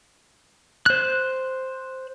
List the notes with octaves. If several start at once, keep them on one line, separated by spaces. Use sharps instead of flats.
C5 F#6